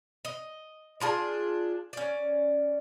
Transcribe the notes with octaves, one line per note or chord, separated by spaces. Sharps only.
D#5
D4 F4 G#4 A5
C#4 D5